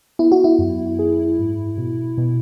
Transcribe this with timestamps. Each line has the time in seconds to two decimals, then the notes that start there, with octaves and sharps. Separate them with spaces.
0.19 B3 E4
0.32 F#4
0.44 E4
0.59 F#2
0.99 G#4
1.39 G#2
1.78 B2
2.18 B2